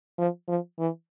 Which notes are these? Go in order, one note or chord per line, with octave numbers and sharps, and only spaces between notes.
F3
F3
E3